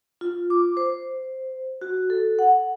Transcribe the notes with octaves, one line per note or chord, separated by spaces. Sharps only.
F4
D6
C5
F#4
A4
F#5